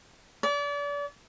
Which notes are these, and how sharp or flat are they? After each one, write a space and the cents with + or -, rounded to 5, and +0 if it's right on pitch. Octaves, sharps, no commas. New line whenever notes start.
D5 -35